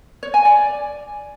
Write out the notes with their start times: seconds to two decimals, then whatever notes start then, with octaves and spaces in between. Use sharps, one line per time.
0.23 C#5
0.34 G#5
0.45 D5